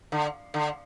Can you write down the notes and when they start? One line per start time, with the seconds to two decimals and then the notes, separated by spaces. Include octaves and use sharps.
0.12 D3
0.54 D3